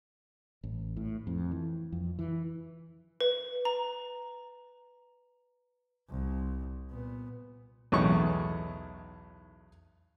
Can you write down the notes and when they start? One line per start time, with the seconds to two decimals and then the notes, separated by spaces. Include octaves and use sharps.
0.64 A1
0.97 A2
1.27 F2
1.52 E3
1.92 F2
2.19 E3
3.21 B4
3.65 A#5
6.09 C2
6.90 A#2 B3
7.92 B1 E2 A2 D#4 C#6